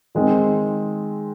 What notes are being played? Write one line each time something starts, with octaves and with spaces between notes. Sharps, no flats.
D#3 G#3 C4